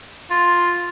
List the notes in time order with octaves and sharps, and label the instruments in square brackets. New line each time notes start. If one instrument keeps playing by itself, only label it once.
[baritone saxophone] F4